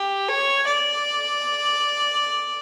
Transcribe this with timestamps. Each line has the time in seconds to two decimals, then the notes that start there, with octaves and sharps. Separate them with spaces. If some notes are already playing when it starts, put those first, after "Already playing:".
Already playing: G4
0.28 C#5
0.67 D5